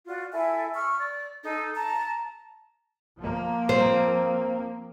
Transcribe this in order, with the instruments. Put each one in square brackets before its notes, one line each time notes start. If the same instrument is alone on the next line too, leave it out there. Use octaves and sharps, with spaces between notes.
[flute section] F4 F#4 D5
E4 A4 E5 G#5
C#6 E6 F6
D5
D#4 A4
A5 A#5
[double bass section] F3 A#3
[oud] C4